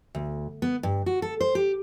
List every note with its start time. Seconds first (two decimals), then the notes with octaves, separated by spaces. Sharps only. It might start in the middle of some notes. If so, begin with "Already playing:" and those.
0.15 D2
0.62 B3
0.83 G2
1.06 F#4
1.22 A4
1.41 C5
1.55 G4